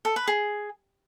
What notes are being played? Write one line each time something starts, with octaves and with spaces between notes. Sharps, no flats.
A4
B4
G#4